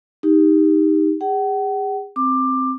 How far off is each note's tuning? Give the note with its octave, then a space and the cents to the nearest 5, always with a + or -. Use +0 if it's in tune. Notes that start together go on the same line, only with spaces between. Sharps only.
D#4 +10 G4 +20
G#4 -35 F#5 +40
C4 +0 D6 +15